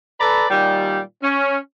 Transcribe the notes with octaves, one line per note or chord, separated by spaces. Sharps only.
A4 B4 D5 A#5 B5
A#2 D#3 G3
C#4